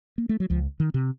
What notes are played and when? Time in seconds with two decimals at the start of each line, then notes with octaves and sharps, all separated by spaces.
0.18 A#3
0.29 A3
0.40 F#3
0.50 C#2 F3
0.80 D#3
0.94 C3